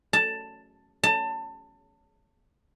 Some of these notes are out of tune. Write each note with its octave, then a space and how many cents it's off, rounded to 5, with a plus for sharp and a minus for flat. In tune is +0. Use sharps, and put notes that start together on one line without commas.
A5 +10
A5 +25